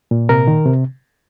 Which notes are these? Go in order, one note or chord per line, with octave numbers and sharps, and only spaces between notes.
A#2
C3 A#4
D#3
C3